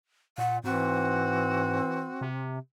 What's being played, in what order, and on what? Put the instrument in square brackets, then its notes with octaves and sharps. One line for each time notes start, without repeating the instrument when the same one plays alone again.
[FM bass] A#2 [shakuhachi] F#5
[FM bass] G#2 [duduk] E3 [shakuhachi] C4 [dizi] F#4
[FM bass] C3